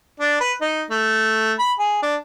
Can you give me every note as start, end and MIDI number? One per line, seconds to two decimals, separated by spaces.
0.20 0.40 62
0.41 0.53 71
0.61 0.84 63
0.91 1.52 57
1.59 1.72 83
1.79 1.98 68
2.03 2.16 62